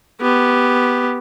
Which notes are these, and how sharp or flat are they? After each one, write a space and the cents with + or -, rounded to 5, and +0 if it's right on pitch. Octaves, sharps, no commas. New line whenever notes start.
B3 +0 G4 -5